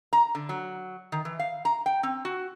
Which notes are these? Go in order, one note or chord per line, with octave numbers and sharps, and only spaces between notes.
A#5
D3
F#3
D#3
E3
F5
A#5
G5
C4
F#4